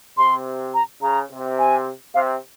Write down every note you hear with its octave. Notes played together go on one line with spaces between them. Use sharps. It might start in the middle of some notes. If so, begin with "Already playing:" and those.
C3 C6
A#5
C#3 A#5
C3
G#5
C3 F5